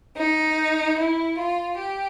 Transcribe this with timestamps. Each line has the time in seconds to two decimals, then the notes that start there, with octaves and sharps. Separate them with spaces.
0.17 D#4
0.98 E4
1.38 F4
1.78 G4